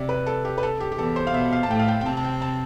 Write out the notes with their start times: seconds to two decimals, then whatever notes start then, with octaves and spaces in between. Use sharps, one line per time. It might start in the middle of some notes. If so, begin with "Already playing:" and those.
Already playing: C3 D5 E5
0.09 B4
0.26 A4
0.45 G4
0.58 B4
0.63 A4
0.80 G4
0.92 G4
0.98 E2 E3 A4
1.16 C5
1.27 F5
1.34 B2 B3 E5
1.52 F5
1.63 A5
1.70 A2 A3 G5
1.79 F5
1.88 G5
2.01 G5
2.06 C3 C4 A5
2.17 A5
2.24 G5
2.42 A5